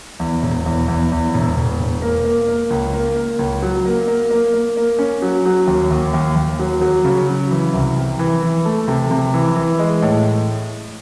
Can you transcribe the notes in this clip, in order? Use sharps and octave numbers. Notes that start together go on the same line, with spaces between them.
E2
E1
E2
E2
E2
E1
E1
E1
A#3
A#3
A#3
C#2
A#3
A#3
C#2
F#3
A#3
A#3
A#3
A#3
A#3
C#4
F#3
F#3
D#2
D#2
D#2
D#2
F#3
F#3
C#3
F#3
E3
C2
C3
E3
E3
A3
C3
C3
E3
E3
G#3
A2